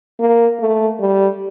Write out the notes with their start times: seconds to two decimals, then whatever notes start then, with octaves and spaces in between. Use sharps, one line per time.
0.20 A#3
0.60 A3
1.00 G3